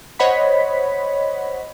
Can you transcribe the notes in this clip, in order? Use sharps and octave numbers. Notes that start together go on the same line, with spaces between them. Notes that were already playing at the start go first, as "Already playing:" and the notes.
C5 C#5 D#5 F#5 B5 B6